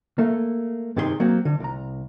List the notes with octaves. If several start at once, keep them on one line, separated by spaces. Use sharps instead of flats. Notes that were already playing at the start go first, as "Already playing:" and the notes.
A3 A#3
G2 C3 D#3 G#4 C#5 C6
F#3 A#3 C4
D3
C2 A#5